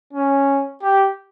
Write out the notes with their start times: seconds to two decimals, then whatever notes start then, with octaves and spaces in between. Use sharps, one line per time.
0.13 C#4
0.82 G4